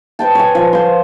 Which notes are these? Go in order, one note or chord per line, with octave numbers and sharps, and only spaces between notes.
B4 C5 G5 A5
C#5 G#5
F3
C5 C6